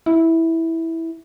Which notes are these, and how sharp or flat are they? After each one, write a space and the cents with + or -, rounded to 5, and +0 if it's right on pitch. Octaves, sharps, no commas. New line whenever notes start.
E4 -10